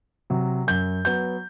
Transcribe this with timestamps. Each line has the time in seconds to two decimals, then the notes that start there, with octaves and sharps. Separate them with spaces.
0.30 C3 F#3
0.67 F#2 G6
1.05 F#3 B3 G6